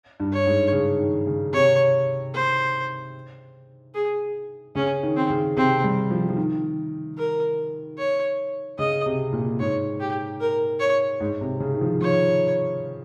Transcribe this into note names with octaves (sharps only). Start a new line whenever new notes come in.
G2
C#5
G#2
C#3
D#3
C#3
C3 C#5
C5
G#4
C#3 C#4
D#3
C4
C#3
C3 C4
G3
F3
F3
D#3
A#4
C#5
C#3 D#5
C3
A#2
G#2 C#5
G4
A#4
C#5
G#2
C3
C#3
D#3
F3
F3 C#5